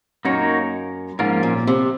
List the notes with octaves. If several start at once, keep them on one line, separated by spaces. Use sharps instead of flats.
F#2 A#3 D#4 F#4 A#4 C#5
G#2 F3 A#3 C#4 F4 A#4
A#2
C3